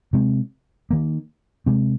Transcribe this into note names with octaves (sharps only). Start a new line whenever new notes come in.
C3 G#3 C4
D#3 A#3
C3 G#3 C4